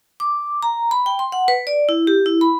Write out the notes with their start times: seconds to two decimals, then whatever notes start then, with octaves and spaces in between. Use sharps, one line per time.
0.20 D6
0.62 A#5
0.91 B5
1.06 G5
1.19 C6
1.32 F#5
1.48 B4
1.67 D5
1.89 E4
2.07 G4
2.26 E4
2.41 B5